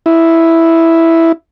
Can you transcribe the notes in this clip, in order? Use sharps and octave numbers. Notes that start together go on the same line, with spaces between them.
E4